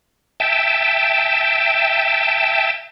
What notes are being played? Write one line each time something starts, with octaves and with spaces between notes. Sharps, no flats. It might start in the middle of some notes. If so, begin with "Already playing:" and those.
E5 G5 A5